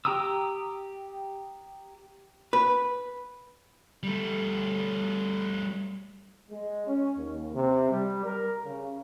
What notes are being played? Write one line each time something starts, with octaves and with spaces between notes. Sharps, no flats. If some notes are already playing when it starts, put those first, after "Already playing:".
G4 G5 A#5 D#6 E6
B4
G3 A3
G#3
C#4
D#2
C3
G3
A#4
C#3